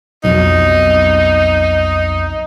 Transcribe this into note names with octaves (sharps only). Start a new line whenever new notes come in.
B1 F2 D#4